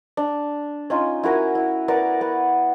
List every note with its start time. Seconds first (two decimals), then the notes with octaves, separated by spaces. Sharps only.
0.17 D4
0.90 C#4 D#4 F4
1.23 E4 F#4 A#4 G#5
1.55 E4
1.88 B3 A#4 D5 D6
2.21 B3